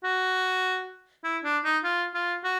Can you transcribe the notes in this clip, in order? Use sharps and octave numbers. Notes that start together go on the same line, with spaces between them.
F#4
E4
D4
D#4
F4
F4
F#4